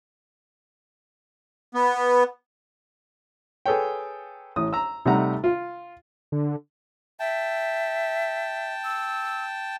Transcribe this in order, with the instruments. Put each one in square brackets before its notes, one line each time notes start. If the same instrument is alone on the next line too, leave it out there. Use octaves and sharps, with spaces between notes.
[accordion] B3
[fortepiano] G#4 A4 B4 C#5 G5
A1 A2 D#6
A#5 E6
C3 G3 A3 D#4 F#5 A#5
F4
[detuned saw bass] D3
[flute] E5 [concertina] G5 A5
[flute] E6